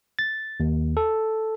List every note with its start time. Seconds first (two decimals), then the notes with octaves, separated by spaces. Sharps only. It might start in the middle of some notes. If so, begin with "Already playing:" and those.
0.19 A6
0.60 D#2
0.97 A4